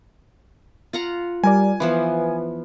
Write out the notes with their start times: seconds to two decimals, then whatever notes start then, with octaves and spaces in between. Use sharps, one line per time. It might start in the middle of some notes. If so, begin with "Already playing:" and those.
0.93 F4 F#5 A#5
1.44 G3 A#4 D5 G#5
1.80 E3 F3 B3 B4